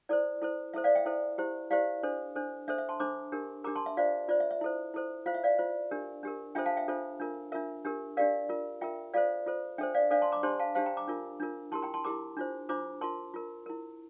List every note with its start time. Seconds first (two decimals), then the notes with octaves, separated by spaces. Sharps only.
0.09 E4 A4 C5 D5
0.42 E4 A4 C5
0.74 E4 A4 C5 E5
0.84 D5 F5
0.95 E5 G5
1.06 E4 A4 C5
1.38 E4 G4 C5
1.71 E4 G4 C5 D5 F5
2.03 D4 A4 C5
2.36 D4 A4 C5
2.68 D4 A4 C5 E5
2.78 E5
2.89 A5 C6
3.00 D4 A4 C5 A#5 D6
3.32 D4 G4 A#4
3.64 D4 G4 A#4 A#5 D6
3.75 A5 C6
3.86 E5
3.97 F4 C5 D5 F5
4.29 F4 C5 D5
4.40 E5
4.51 E5
4.61 E4 A4 C5
4.94 E4 A4 C5
5.26 F4 C5 F5
5.34 E5
5.43 D5 F5
5.59 F4 C5
5.91 D4 G4 A#4
6.23 D4 G4 A#4
6.55 D4 F4 A4 C5 E5 G5
6.66 F5 A5
6.77 E5 G5
6.88 D4 F4 A4 C5
7.20 D4 F4 A#4
7.52 D4 F4 A#4 E5
7.85 D4 G4 A#4
8.17 D4 G4 A#4 D5 F5
8.49 F4 A#4
8.81 F4 A#4 E5 G5
9.14 F4 A4 C5 D5 F5
9.46 F4 A4 C5
9.78 D4 A4 C5 E5 G5
9.94 D5 F5
10.11 D4 A4 C5 D5 F5
10.22 A5 C6
10.32 A#5 D6
10.43 D4 G4 C5 A5 C6
10.59 F5 A5
10.75 D4 G4 C5 F5 A5
10.86 G5 A#5
10.97 A#5 D6
11.08 D4 F4 A#4
11.40 D4 F4 A#4
11.72 E4 G4 A#4 A5 C6
11.82 G5 A#5
11.94 A5 C6
12.04 E4 G4 A#4 A#5 D6
12.37 D4 F4 C5
12.69 D4 F4 C5 A#5 D6
13.01 F4 A#4 A5 C6
13.34 F4 A#4
13.66 E4 A#4